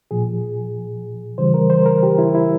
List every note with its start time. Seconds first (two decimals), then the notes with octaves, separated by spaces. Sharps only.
0.11 A#2 F3 G#4
1.38 C#3 E3 G3 C5
1.54 A#4
1.70 C5
1.86 A#4
2.03 G4
2.18 E4
2.35 E4